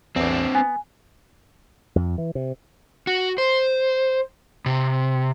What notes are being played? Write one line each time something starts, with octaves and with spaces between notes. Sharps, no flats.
A1 E2 C4 D4
B3 G#5
F2
E3
C3
F#4
C5
C3